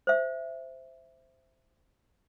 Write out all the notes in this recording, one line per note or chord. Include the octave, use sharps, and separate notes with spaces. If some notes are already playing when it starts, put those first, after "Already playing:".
C5 E5